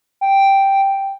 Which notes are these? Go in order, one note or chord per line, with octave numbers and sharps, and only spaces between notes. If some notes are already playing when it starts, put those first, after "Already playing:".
G5